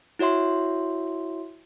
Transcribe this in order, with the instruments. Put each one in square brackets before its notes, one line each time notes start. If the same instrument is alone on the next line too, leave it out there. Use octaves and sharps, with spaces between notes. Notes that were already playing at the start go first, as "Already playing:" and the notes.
[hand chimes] E4 F#4 C#5 E5 C6